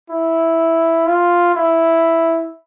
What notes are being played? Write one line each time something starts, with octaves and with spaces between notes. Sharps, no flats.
E4
F4
E4